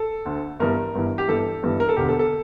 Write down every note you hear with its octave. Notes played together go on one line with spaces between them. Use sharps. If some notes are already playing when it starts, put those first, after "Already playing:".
Already playing: A4
D2 D3
G1 G2 E3 A#4
G1 G2 E3
G4
G1 G2 E3 A4
G1 G2 E3
A#4
A4
E1 D2 D3 G4
A4
A4